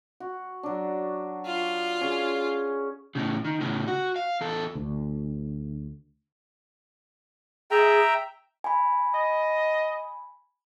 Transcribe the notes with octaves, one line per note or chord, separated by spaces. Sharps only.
F#4
F#3 D4
F4
C#4 G#4
A2 C#3
D#3
A2 C#3
F#4
F5
E2 A4
D2
G#4 E5 G5 A#5
G#5 B5
D#5